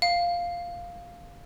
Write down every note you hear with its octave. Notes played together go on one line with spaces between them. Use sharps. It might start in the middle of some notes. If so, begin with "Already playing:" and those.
F5